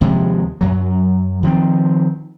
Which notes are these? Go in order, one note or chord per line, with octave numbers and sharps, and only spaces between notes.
D#2 C3 F3 G#3
F#2 F#3
D#3 F3 C4